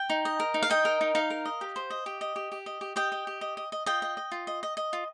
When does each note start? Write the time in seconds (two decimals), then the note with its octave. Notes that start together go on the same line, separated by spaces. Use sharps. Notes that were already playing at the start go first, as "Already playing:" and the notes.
Already playing: G5
0.10 D#4
0.25 D#5
0.40 A#4
0.54 D#4
0.63 F5
0.70 D#4 D#5 G5
0.85 A#4
1.01 D#4
1.15 D#4 F5
1.30 A#4
1.45 D#5
1.61 G4
1.76 C5
1.90 D#5
2.06 G4
2.21 D#5
2.36 G4
2.52 G4
2.66 D#5
2.81 G4
2.96 G4 D#5 G5
3.12 D#5
3.27 G4
3.41 D#5
3.57 D#5
3.72 D#5
3.86 F4 D#5 G5
4.02 D#5
4.17 D#5
4.32 F4
4.47 D#5
4.63 D#5
4.77 D#5
4.93 F4